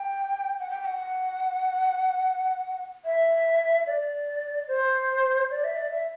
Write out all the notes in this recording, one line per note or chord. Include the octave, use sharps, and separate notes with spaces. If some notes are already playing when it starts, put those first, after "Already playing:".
Already playing: G5
F#5
G5
G5
F#5
E5
D5
C5
D5
E5
D5
E5